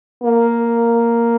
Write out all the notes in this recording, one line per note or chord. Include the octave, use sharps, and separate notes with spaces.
A#3